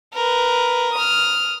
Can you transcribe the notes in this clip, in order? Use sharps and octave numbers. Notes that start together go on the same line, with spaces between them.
A#4 B4
D#6 F6